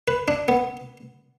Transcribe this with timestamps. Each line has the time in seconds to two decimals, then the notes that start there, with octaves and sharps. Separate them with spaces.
0.08 B4
0.28 D4
0.48 B3